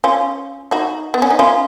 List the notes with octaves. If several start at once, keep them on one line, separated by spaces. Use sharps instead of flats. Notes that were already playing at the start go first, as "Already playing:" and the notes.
C#4 F4
D#4 F#4
B3
C#4
D#4
C#4 F4